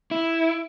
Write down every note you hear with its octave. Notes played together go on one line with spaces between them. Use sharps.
E4